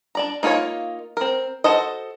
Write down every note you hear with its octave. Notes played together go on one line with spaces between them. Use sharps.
D4 D5 A#5
A#3 D#4 F4 A4 C#5
C4 A#4
F#4 A4 C5 D#5